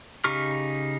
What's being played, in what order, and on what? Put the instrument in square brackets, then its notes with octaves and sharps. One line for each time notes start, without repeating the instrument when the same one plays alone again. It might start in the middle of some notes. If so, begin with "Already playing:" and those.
[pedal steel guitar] C#3 D#4 G4 C#6 F6